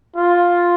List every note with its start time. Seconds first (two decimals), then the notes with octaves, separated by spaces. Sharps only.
0.16 F4